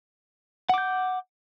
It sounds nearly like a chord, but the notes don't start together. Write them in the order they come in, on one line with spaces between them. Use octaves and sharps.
F#5 D6 G6